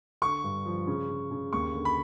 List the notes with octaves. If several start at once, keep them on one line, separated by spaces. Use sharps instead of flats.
D3 C#6
G2
F3
C#3
C#3
C#3
D#2 C#6
D3
B5